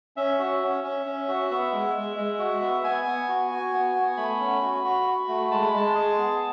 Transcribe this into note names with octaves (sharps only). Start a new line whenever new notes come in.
C#4 E5
F#4
C#4
C#4
C#4
F#4
B3 E5
G#3
G#3
G#3
F#4
B3
B3 G#5
B3
F#4
F#4
B3
B3
A3 B5
C#4
F#4
F#4
F#4
A3
G#3 A5
B5
G#3 A5
G#4
B3